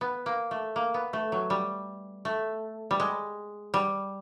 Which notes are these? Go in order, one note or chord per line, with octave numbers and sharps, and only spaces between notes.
B3
A#3
A3
A#3
B3
A3
F#3
G3
A3
G3
G#3
G3